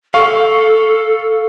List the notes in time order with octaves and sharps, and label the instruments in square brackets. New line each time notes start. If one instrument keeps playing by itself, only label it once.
[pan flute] A4 [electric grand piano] F5 C#6